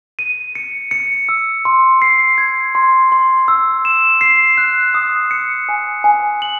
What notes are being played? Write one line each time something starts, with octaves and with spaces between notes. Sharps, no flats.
D#7
C#7
C#7
E6
C6
C7
G#6
C6
C6
E6
E7
C7
F#6
D#6
C#7
G#5
G#5
F#7